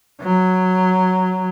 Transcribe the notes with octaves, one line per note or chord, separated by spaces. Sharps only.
F#3